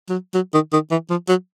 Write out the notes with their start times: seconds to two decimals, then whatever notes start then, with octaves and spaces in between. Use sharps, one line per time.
0.09 F#3
0.34 F#3
0.53 D#3
0.72 D#3
0.91 E3
1.10 F3
1.29 F#3